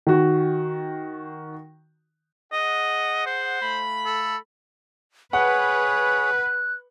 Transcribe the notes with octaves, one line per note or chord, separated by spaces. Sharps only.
D#3 F#4
G#4 D#5 F#5
C5
A3 F5 B5
A4
G#4 B4 C#5 F#5 F#6